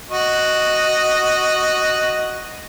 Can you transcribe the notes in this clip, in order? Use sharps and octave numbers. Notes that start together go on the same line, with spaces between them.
F#4 D#5